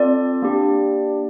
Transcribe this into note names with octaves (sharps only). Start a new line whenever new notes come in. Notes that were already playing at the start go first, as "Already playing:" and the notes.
Already playing: C4 F4 A4 D5
A#3 D4 G4